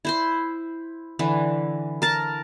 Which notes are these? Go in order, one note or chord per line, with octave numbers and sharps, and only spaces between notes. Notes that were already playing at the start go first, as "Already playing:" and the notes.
E4 C5 C6
D3 E3
A#4 A5